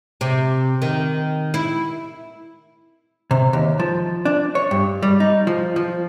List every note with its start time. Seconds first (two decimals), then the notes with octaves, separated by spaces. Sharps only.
0.21 C3
0.82 D#3
1.54 E4
3.31 C3
3.53 D#2
3.79 F3
4.25 D4
4.55 C#5
4.71 G2
5.02 G3
5.20 D#4
5.47 F3
5.76 F3